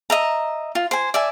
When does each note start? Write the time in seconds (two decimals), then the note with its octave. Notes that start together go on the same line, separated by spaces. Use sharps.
0.10 D#5 E5 A#5
0.75 F4
0.91 C5 G#5
1.14 D5 E5 G#5